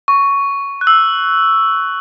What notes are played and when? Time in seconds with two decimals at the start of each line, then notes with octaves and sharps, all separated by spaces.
0.08 C#6
0.81 F#6
0.87 E6